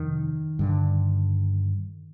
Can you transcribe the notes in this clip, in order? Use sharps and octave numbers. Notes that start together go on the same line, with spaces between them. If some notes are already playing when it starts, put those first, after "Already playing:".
Already playing: F2 C3 D#3
G2 D3